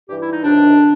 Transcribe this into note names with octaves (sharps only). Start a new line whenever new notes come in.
G2 E3 G4
E4
D#4
C#2 C3 D#3 D4
D3